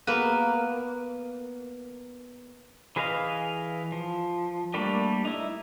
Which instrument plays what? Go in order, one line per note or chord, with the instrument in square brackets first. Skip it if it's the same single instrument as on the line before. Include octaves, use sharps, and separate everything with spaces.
[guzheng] A#3 B3 B4
[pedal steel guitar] E3 G#4 B4 D#5 F5
F3
G3 A3 A#3 D4 G4
D#4 E4